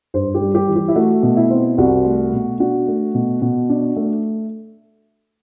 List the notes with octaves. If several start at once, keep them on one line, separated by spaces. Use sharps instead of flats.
G2 C5
G4
G3
G4
E3
G4
E4
A3 F#4
B2
E4
C4
C2 F#4
A3
B2
D4 F#4
A3
B2
B2
D4
A3